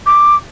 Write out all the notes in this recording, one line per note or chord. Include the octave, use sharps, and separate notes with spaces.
D6